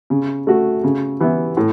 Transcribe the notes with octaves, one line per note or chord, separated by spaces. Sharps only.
C#3
A3 F#4
C#3
E3 B3 E4
A2